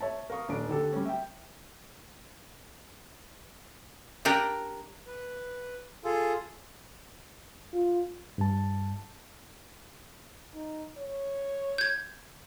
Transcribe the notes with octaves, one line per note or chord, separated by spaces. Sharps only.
C#5 E5 A5
A#4 F5 C#6 D#6
D#1 D4 D7
D3 G4 A4
G3 C#4
E5 G5
D4 G4 A#4
B4
F4 G#4 A4
F4
G2 A5
D#4
C#5
G6 G#6